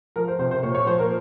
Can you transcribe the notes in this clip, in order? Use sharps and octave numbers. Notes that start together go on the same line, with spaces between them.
F3 A#4
C5
C3 C5
C5
A#2 C#5
C#5
F3 C5
A#4